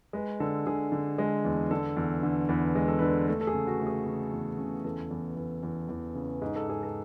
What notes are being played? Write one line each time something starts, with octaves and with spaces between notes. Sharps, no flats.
G#3 B4
D3 A4
D3 G#4
D3
G#3
E2
D3 A4
E2
D3
E2 B4
G#3
A4
D3 B4
A4
A3 A4
A4
G#4
C#3
F#4
A3
G#4
C#3
E2
C#3
E2 A4
E2
E2
E2
E2
C#3
G#2 G#4
A4
G#2 G#4
A4